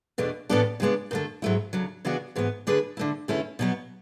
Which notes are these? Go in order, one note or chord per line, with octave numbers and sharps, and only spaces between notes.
E2 B2 A3 D4
A2 E3 B3 D4 A4
C#3 G#3 B3 D4
F#2 D3 A3
G#2 F#3 A3 E4
D2 C#3 F#3
C#3 E3 B3 D4 F#4
G#2 E3 B3
D3 A3 D4 G#4 B4
D3 A3 E4
E2 D3 A3 C#4 E4
B2 F#3 B3